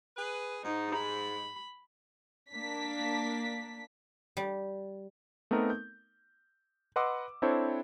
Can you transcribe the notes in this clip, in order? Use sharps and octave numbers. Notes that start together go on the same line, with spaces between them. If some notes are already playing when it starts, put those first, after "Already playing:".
G#4 B4
G#2 D#4
B5
A#3 D4 B6
G3
A3 B3 C4 D#4 A#4
G6
B4 D#5 F#5 C6 D6 E6
C4 D4 E4 A4 C5 C#5